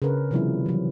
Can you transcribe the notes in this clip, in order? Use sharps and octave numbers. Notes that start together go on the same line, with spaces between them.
C#3 C#4 D4 A#4 B4
C3 D#3 F3 G3 B3 E4
E3 F#3